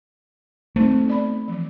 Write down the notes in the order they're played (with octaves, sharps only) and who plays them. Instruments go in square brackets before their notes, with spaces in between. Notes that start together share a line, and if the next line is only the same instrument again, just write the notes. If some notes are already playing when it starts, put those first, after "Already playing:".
[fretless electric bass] A3 [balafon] C4 D#4 C5
[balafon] B3 D5 B5
E3 F3